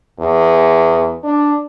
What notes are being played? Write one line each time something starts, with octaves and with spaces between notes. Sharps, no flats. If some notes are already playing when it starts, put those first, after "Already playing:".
E2
D4